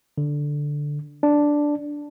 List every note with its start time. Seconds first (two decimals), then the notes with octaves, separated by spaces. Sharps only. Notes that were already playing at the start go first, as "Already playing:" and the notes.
0.18 D3
1.23 D4